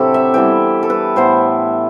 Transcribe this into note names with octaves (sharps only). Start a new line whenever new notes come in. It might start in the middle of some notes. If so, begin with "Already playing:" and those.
Already playing: A2 C3 F#3 C4 D4 E4 G4 A4
E5
E3 G3 B3 E4 G5
A4
B4
A2 E3 B3 E4 C5